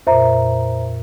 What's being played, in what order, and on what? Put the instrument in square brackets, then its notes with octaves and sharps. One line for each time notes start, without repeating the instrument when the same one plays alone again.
[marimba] F2 A#2 [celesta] C5 E5 A#5